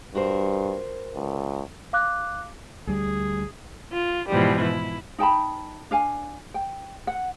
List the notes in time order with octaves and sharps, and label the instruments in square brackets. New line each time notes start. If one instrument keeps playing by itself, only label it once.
[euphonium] G2 [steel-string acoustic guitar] F#4 A#4 C5
[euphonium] C#2
[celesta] F5 D6 F#6
[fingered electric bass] D2 G3 [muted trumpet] G#4
[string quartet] F4
G#2 B2 E3 F3 G3
E4
[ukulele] D#4 G5 A5 B5
D4 F5 G#5
G5
F#5